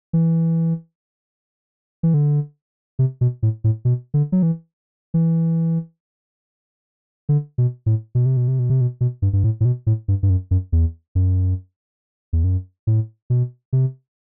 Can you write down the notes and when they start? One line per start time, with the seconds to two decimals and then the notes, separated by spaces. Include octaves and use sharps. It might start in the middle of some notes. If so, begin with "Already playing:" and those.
0.13 E3
2.03 E3
2.14 D3
2.99 C3
3.21 B2
3.43 A2
3.64 A2
3.85 B2
4.14 D3
4.32 F#3
4.43 E3
5.14 E3
7.29 D3
7.58 B2
7.86 A2
8.15 B2
8.26 C3
8.37 B2
8.48 C3
8.59 B2
8.70 C3
8.81 B2
9.01 B2
9.22 G2
9.33 G2
9.44 A2
9.60 A2
9.65 B2
9.87 A2
10.08 G2
10.23 G2
10.30 F#2
10.51 F#2
10.72 E2
11.15 F#2
12.33 E2
12.44 F#2
12.87 A2
13.30 B2
13.73 C3